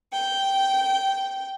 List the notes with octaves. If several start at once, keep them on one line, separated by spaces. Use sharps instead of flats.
G5